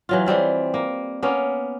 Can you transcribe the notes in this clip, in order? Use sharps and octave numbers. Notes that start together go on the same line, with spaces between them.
E3 F#3 F4
E3 G3 C4 F4
A#3
A#3 B3 C#4